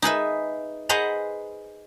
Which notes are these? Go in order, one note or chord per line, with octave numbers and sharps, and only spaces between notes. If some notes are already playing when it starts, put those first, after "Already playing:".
D#4 G#4 B4 E5
G#4 B4 C5 D#5 F#5 A#5